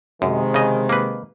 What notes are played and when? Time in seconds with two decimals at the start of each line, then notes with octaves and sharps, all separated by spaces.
0.22 F#2 C3 D#3 G#3
0.54 C#3 D#5
0.89 A#3 B4